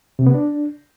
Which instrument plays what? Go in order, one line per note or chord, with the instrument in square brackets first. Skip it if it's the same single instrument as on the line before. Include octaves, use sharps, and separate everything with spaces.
[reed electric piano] C3
B3
D4